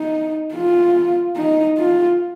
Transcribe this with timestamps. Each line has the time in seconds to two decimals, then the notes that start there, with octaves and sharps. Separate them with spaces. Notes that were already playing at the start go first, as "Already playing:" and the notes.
Already playing: D#4
0.55 F4
1.37 D#4
1.77 F4